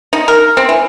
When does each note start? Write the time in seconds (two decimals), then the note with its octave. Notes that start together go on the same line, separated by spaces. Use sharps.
0.13 D#4
0.28 A#4
0.57 C4
0.69 E3